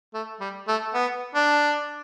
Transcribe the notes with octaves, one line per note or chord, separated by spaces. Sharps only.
A3
G3
A3
B3
D4